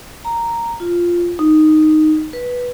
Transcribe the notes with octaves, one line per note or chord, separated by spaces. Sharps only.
A#5
F4
D#4
B4